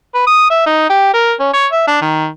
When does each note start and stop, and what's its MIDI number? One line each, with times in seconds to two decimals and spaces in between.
0.15 0.25 71
0.27 0.49 87
0.50 0.63 76
0.66 0.85 63
0.90 1.14 67
1.14 1.33 70
1.40 1.53 61
1.54 1.67 73
1.72 1.83 76
1.88 2.01 62
2.02 2.27 51